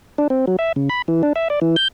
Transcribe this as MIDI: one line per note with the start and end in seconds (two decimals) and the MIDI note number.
0.18 0.28 62
0.30 0.45 60
0.47 0.56 54
0.59 0.72 76
0.76 0.89 49
0.89 1.02 83
1.08 1.22 52
1.23 1.33 62
1.36 1.48 76
1.50 1.60 74
1.61 1.76 52
1.76 1.88 91